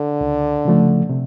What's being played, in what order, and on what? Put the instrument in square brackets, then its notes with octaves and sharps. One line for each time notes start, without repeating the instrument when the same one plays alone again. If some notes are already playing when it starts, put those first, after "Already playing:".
Already playing: [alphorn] D3
[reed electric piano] C#2
C#3 F3 A3
C3